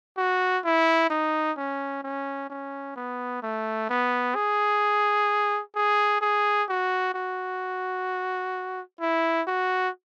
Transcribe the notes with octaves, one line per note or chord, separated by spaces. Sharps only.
F#4
E4
D#4
C#4
C#4
C#4
B3
A3
B3
G#4
G#4
G#4
F#4
F#4
E4
F#4